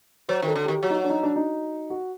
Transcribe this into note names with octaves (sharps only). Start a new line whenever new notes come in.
F#3 C5
D#3 A4
D3
D#3 G4
F#3 F#4
D#4
F#4
D4
D#4
D4
D#4
F#4